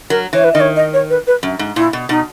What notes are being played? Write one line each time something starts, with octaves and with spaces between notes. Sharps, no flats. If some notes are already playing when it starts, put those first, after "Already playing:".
F#3 A#4
E3 C#5
B4
D#3 D#5
C#5
D#5
C#5
B4
B4
F#2
G#2
A#2 E4
B2
B2 D#4